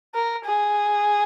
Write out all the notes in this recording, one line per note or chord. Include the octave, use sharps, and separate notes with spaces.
A#4
G#4